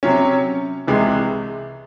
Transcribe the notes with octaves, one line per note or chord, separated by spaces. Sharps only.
C3 F#3 C#4
C2 C3 E3 G#3